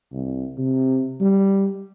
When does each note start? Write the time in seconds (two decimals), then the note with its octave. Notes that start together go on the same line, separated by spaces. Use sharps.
0.12 C2
0.57 C3
1.20 G3